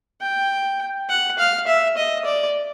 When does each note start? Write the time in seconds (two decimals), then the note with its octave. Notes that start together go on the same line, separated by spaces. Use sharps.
0.21 G5
1.09 F#5
1.38 F5
1.67 E5
1.97 D#5
2.25 D5